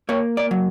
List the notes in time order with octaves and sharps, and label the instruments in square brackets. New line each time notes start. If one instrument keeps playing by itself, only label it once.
[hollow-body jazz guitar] A#3 C#5
D5
F#3